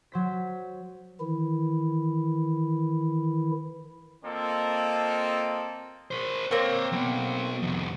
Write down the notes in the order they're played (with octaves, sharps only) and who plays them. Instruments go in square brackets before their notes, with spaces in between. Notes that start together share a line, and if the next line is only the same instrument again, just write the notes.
[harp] F#3 C5 B6
[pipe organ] D#3 E3 E4
[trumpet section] A#3 C4 F4 A4 D#5
[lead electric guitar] A#4 C5
[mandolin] A#3 C4 [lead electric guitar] C5 C#5
[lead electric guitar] F#3 B3
C2 F2